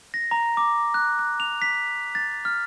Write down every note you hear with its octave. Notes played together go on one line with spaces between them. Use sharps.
A#6
A#5
D6
F#6
F#6
F7
B6
A6
F6